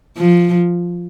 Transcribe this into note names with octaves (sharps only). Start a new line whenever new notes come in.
F3